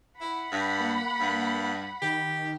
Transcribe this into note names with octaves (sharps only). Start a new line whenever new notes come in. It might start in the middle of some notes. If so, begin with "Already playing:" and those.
E4 F#5 B5
G2
A#3
G2
D#3 G4